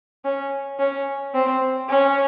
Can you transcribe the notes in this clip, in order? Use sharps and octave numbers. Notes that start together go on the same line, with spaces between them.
C#4
C#4
C4
C#4